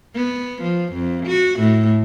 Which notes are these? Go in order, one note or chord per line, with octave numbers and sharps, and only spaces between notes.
B3
F3
F2
F#4
A2